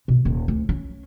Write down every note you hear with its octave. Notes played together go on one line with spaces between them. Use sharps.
B2
D#1
D2
C#4